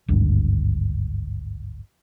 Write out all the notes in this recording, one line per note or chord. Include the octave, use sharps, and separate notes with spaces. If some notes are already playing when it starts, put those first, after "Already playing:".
G#1 D2 G2